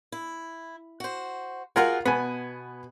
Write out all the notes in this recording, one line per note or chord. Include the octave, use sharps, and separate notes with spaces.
E4
F#4 C5
F4 F#4 G#4 A#4 F#5 G#5
B2 B3 G#5